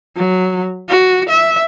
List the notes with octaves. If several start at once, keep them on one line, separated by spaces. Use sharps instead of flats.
F#3
F#4
E5